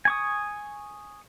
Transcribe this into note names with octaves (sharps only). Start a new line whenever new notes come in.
G#5 C#6 D#6